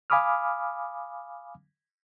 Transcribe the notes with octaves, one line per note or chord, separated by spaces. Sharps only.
F5 G#5 B5 D6 D#6 F6